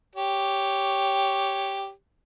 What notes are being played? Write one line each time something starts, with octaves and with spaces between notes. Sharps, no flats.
G4 C#5